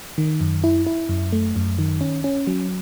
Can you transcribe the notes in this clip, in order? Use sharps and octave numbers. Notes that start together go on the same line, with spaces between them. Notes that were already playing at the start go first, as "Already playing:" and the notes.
D#3
F#2
E4
E4
F#2
A3
F#2
D#3
C#4
C#4
F#3